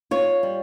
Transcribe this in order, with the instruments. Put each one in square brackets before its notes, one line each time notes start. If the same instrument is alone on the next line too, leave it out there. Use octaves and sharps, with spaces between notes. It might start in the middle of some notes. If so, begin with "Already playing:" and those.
[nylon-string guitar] F4 C#5
G3